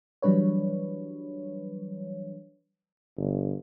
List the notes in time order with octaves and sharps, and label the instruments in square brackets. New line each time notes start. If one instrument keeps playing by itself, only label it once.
[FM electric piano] E3 F#3 G3 D4 B4 C#5
[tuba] G1